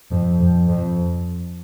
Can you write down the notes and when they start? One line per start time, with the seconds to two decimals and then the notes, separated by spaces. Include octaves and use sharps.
0.11 F2
0.40 F2
0.69 F2